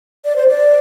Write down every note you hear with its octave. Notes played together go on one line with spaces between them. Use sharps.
D5
C5
D5